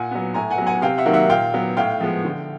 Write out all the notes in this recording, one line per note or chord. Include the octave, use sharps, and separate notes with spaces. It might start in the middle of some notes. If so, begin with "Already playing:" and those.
Already playing: A#2 F#5 G#5
F#3 B3
A2 G#5 A#5
F#5 G#5
F#3 B3
F#5 G#5
C3 F5 G5
E5 F#5
D#3 F#3 A#3
E5 F#5
A#2 F5 G5
F#3 B3
A2 F5 G5
F3 G#3 B3
D3